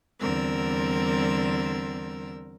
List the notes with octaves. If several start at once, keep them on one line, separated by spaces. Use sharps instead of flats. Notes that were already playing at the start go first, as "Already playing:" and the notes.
E2 D3 G3 C4 A#4 E6